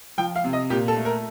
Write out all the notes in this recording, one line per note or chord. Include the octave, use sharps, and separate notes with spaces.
F3 G5
F5
C3
D#5
A#2 G4
A4
A3
A#4